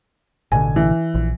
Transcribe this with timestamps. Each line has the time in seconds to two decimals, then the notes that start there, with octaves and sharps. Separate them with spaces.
0.52 A1 B2 D3 G#5
0.76 E3
1.15 A#1